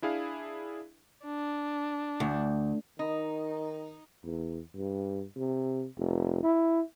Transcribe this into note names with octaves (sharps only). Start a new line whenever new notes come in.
D4 E4 G#4 F5
D4
D2
D#3 D#4
E2
G2
C3
F1
E4